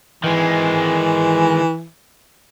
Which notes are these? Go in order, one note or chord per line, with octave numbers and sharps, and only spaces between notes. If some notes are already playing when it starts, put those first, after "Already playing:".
D#3 E3 G#3